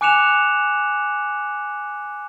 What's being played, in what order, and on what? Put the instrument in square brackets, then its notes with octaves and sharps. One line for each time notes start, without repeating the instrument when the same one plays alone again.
[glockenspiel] G#5 D6 F#6 C#7 E7 F7